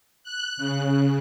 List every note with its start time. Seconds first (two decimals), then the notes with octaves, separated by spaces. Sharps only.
0.23 F#6
0.57 C#3